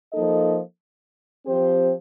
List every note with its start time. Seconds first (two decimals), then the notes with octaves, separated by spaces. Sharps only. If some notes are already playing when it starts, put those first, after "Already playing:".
0.12 F3 A#3 D#4 A4 D#5
1.46 F3 C4 G4 C5